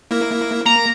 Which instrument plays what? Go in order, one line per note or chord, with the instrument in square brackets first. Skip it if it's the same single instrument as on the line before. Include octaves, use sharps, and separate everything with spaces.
[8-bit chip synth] A#3 E4 A#4
[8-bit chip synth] A#3 [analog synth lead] A#5